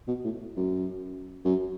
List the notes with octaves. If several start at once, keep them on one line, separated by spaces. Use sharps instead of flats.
B2
A2
F#2
F#2